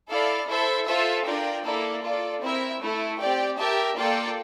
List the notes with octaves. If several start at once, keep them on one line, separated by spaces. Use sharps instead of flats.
E4 A4 D5 F5
E4 A4 C5 E5
F4 A4 C5 E5 A5
D4 F4 A#4 D5 G5
A#3 E4 A4 D5
F4 A4 D5
C4 E4 A#4 E5
A3 E4 A4
C4 G4 D5 G5
G4 A#4 E5 A5
A#3 F4 A4 D5 G5